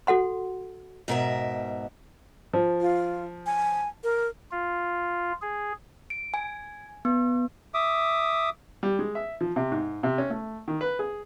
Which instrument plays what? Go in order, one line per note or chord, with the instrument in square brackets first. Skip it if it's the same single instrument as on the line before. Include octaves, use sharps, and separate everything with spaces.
[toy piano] F#4 A4 F#5 C6
[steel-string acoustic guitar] G#2 B2 A#4 E5
[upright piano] F3
[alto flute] F4
G#5
A#4
[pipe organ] F4
G#4
[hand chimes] D7
G#5
B3
[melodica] E5 D6 D#6
[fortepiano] G3
G#3
E5
F3
C3
G#2
C3
C#4
A3
D#3
B4
G#4